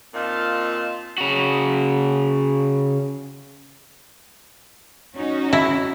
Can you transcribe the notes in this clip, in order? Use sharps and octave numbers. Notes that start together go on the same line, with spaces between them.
A#2 C4 D#4 F4 F5 A5
C#3 F#4
C#4 D#4 F#4
E4